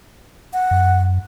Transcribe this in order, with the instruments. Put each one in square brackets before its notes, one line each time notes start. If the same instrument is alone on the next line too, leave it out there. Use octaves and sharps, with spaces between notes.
[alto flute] F#5
[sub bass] F#2